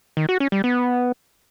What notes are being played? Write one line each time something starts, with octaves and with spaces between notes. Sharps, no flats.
D#3
F#4
C#4
G3
B3